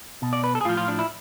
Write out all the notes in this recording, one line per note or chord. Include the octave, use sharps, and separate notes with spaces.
B2
D5
B4
A4
G#4
A2 F3 F4
F4
D4
E4